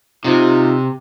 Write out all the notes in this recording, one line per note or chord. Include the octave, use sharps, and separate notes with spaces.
C3 D#4 F4